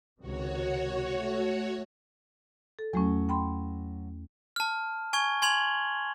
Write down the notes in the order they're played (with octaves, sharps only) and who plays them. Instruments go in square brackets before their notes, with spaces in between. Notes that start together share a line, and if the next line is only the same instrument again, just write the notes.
[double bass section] C#2 C3 D#3 [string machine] F#4 C#5
[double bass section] A3
[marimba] A4
[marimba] E2 A3 C#4 [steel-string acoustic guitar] F#3
[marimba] G5 B5 C6
[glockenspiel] A5 F6
G#5 C#6 G#6 G7
G#5 C6 G#6 F7 F#7